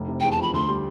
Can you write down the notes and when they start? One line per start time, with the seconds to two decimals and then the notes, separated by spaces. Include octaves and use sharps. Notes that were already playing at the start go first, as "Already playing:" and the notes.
Already playing: F1
0.08 C3
0.20 E2 G5
0.31 A5
0.38 F3 B5
0.53 D2 C6
0.69 G3